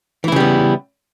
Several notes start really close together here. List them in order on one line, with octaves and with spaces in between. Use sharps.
E3 E4 C#3 G3 B3